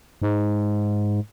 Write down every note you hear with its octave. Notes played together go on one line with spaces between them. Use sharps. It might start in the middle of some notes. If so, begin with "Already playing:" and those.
G#2